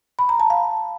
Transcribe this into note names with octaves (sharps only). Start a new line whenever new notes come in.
B5
A#5
A5
F5